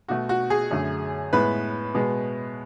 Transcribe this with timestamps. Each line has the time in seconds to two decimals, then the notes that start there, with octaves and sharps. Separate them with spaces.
0.08 B2 A3 F#4
0.29 F#4
0.50 G#4
0.71 F#2 D3 A3
1.33 A2 G#3 B3 B4
1.94 B2 G#3 B3